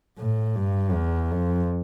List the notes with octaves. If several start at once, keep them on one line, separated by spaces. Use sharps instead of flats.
A2
G2
E2
F2